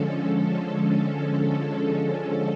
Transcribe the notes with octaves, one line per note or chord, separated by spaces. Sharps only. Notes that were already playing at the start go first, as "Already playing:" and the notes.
Already playing: D3 F3 G#3 C#4 A4